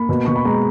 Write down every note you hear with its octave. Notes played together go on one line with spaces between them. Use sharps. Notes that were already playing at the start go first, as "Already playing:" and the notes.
Already playing: A#3 B5
B2
B2 C#6
B5
G#3 A#5